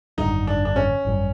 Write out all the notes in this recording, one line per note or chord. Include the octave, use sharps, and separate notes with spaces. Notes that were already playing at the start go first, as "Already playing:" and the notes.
G#1 F#2 D3 G3 D#4
D4
D4
C#4
G#1 F#2 D3 G3